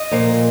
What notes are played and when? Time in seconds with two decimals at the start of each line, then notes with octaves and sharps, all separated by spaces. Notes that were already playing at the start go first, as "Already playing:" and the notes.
Already playing: D#5
0.11 A#2 F3 A#3